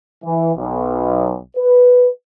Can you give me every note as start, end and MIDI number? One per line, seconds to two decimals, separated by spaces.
0.24 0.51 52
0.56 1.36 35
1.57 2.08 71